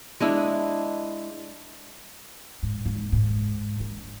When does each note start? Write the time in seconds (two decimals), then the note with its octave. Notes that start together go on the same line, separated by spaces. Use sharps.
0.20 G#3 D4 E4
2.63 G#2
2.86 G#2
3.12 G#2
3.80 D3